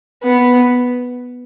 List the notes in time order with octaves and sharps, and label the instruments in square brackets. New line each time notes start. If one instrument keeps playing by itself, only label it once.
[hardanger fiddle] B3